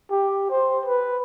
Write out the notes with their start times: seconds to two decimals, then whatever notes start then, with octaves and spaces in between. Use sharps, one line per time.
0.11 G4
0.50 C5
0.85 B4